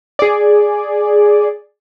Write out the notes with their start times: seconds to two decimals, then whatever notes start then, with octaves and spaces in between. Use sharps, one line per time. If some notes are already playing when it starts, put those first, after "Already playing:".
0.19 G#4 D5